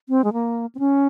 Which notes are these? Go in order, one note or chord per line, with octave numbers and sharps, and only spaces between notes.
C4
G#3
A#3
C4
C#4